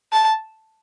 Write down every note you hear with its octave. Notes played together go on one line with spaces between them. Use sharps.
A5